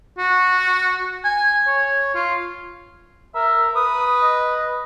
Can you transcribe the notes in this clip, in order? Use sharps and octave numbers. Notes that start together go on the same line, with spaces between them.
F#4
G#5
C#5
F4
A#4 E5
B4 D#6
D#5